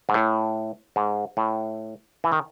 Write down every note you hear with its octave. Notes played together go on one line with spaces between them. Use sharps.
G#2
A2
G#2
A2
E3
D#3